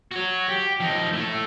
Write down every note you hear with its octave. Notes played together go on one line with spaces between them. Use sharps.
F#4 C#5
G4
F3 D#4
A3 E4